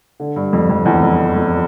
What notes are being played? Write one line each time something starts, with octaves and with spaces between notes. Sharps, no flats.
D3
G2
F2
F2
E2
F2
F2